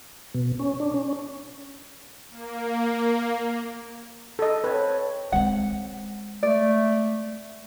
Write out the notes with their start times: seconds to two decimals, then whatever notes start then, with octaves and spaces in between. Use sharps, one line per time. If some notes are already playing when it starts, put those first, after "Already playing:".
0.34 B2
0.59 C#4
0.80 D4
0.94 C#4
2.30 A#3
4.39 A4 D#5
4.64 C4 B4 C#5 A5
5.32 G#3 C4 F#5
6.43 A3 D5